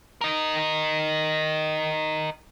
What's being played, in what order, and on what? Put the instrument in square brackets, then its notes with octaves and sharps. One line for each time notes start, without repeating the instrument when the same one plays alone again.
[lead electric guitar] A#4 D#5